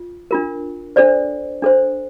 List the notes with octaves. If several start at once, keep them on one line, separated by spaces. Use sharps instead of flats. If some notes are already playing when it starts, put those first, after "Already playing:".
Already playing: F4
D4 F4 A#4
D4 A4 C5 D5
D4 A4 C5